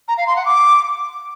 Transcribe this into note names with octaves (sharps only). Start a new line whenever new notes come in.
A#5
F5
C6
F#5
D6